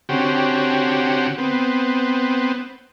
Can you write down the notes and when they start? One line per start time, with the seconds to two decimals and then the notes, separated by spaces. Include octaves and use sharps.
0.09 D3 C4 C#4 F#4 G4
1.38 B3 C4